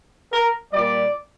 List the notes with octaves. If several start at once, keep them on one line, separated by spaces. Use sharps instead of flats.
A#4
A#2 G3 D5